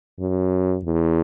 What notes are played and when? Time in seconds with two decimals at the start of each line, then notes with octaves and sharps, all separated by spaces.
0.19 F#2
0.84 E2